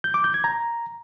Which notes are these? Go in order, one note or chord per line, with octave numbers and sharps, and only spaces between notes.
G6
D6
G6
G#6
A#5